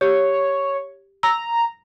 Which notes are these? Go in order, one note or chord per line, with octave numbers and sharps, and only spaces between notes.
G4 C#5
A#5 E6